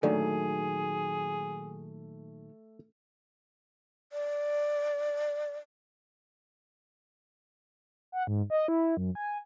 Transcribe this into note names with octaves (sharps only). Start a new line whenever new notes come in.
A#2 D3 D#3 F#3 A3 G#4
D5
F#5
G#2
D#5
E4
F#2
G#5